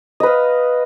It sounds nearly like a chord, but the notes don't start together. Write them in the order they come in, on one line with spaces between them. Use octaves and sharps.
D#5 B4 F5